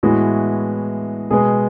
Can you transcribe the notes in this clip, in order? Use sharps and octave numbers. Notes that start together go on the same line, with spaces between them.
A2 E3 G#3 B3 F#4
B2 G#3 B3 G#4